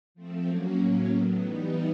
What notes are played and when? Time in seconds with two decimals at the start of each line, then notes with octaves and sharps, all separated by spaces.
0.15 F3 A3 C4
0.46 F#3 A#3 C#4 F#4
0.78 A2 F#3 A#3 C#4
1.10 A2 F#3 B3
1.41 E3 G3 B3 D#4